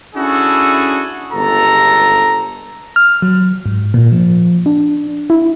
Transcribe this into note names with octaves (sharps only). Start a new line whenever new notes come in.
C#4 D4 E4 F#4 G#4 A4
G1 C#2 A4 A5 A#5
F6
F#3
G#2
A#2
F3
D4
E4